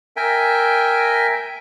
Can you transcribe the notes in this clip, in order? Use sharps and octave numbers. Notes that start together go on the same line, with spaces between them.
A#4 E5 G5 G#5